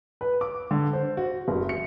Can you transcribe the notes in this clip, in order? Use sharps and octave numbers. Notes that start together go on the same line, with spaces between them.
B4
D6
D3
C5
F#4
F#1
C#7